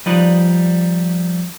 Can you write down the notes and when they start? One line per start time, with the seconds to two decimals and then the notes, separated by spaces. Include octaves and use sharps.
0.06 F3 G3 D#4 B4 D5 D#5